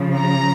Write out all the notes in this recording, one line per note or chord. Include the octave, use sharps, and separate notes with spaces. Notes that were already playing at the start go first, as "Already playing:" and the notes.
Already playing: C#3 F3
A#5